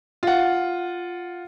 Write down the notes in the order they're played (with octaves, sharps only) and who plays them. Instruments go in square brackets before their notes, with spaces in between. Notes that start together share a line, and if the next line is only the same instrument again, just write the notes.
[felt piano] F4 F#5